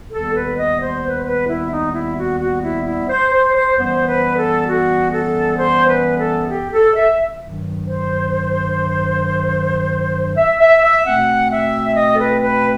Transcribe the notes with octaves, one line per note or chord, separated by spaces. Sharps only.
D#2 D#3 G3 B3 A4
B4
D#5
C5
B4
C5
B4
E4
D#4
E4
F#4
F#4
E4
E4
C5
C5
C5
F#2 E3 G3 B3 C5
B4
A4
F#4
A4
C5
B4
A4
G4
A4
E5
G2 D#3 F#3
C5
E5
E5
E5
B2 A3 C4 F#5
E5
D#5
A4
B4
B4